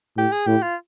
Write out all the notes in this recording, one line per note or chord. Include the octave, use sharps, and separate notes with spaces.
A2 G4
G#4
A2 G4
F4